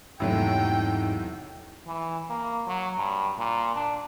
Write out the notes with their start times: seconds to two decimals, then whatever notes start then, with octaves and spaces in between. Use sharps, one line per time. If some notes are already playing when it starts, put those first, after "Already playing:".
0.20 E2 G#2 C3 F#3 A3 E4 G5
1.86 E3
2.30 A#3
2.67 F#3
2.98 G2
3.38 A#2
3.76 D4